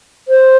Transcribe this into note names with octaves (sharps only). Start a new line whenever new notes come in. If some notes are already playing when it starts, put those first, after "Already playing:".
C5